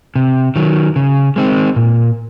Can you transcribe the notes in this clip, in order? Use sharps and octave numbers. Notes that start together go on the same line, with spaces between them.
C3
D#3 F#3
C#3
G#3 C4 D#4
A#2